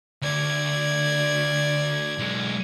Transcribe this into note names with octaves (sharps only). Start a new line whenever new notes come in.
D2 D5 G#6
B1 G#3